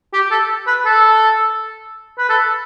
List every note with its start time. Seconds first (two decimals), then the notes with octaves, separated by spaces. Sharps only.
0.13 G4
0.31 A4
0.67 B4
0.85 A4
2.18 B4
2.29 A4